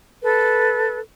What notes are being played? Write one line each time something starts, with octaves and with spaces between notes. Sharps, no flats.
A4 B4